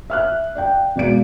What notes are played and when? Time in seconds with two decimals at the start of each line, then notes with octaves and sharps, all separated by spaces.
0.10 E5 F6 F#6
0.55 D5 F5 G5
0.96 B2 G#3 D5 F5 D7